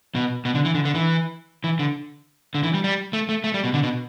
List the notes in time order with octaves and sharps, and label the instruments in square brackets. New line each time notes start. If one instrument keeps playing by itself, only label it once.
[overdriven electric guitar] B2
B2
D3
E3
D3
D3
E3
E3
D3
D3
E3
G3
G3
A3
A3
A3
G3
B2
D3
B2